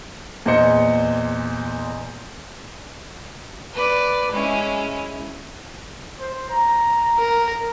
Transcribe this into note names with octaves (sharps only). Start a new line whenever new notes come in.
E2 A#2 C5 D#5 C#7
B4 D5
G#3 C#4 E4
C5
A#5
A#4